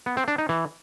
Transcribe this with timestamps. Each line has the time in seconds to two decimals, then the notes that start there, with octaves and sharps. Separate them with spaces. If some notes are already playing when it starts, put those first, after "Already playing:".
0.06 B3
0.17 C4
0.28 D4
0.38 D#4
0.49 E3